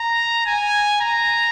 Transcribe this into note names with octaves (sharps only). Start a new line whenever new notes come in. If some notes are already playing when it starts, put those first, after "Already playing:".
Already playing: A#5
G#5
A#5